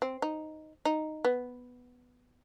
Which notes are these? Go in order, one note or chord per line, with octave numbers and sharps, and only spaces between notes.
C4
D#4
D#4
B3